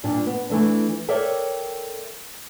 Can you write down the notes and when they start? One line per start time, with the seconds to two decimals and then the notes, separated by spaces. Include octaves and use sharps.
0.04 G2 A#2 D4
0.27 B3
0.50 E3 A3 D4
1.09 A4 A#4 C#5 D5 E5 G5